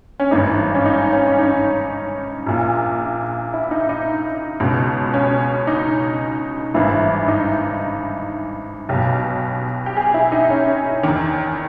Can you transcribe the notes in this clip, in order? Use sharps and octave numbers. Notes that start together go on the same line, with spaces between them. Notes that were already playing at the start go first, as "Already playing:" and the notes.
C#4
G#1 G2 E3 D#4
C#4
D#4
C#4
C#4
D#4
A#1 A#2
E4
D#4
D#4
C#2 B2
C#4
D#4
G#1 G2 E3 E4
D#4
B1 B2 G4
G4
G#4
E4
D#4
C#4
E2 D#3